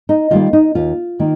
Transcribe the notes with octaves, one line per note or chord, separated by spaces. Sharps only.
D#4
D#3 G3 A#3 F4
D#4
D#2 F4
D#3 A#3